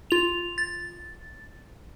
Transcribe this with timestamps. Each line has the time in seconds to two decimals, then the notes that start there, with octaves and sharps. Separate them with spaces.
0.11 F4 F7
0.58 A6